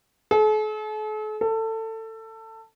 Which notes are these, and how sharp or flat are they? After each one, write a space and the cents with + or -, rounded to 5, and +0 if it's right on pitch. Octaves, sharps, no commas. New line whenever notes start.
A4 -45
A4 +20